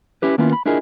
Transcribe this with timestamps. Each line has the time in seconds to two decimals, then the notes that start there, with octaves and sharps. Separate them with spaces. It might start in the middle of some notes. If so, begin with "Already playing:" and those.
0.22 C#4 E4 G4 B4
0.38 D#3 A#3 B3 C#4 E4 F4
0.53 B5
0.66 D4 E4 F4 G#4 A#4 D#5